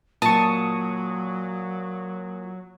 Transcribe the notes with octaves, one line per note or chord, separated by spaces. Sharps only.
A#2 F#3 A5 C#6 D#6